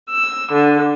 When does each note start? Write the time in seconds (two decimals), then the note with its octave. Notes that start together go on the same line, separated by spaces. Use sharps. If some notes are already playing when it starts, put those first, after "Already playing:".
0.11 E6
0.53 D3